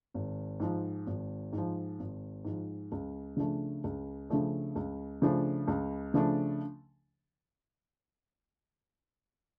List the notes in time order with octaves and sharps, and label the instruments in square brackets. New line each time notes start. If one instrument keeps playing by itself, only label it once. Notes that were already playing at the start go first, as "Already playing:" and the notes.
[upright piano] G#1
G#2 F3
G#1
G#2 F3
G#1
G#2 F3
C#2
C#3 F3 A3 D4
C#2
C#3 F3 A3 D4
C#2
C#3 F3 A3 D4
C#2
C#3 F3 A3 D4